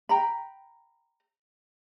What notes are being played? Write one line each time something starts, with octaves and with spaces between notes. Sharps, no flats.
G5 A#5 B5